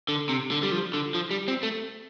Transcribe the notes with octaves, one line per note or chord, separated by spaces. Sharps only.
D3
C3
D3
G3
F3
D3
F3
G3
C4
A3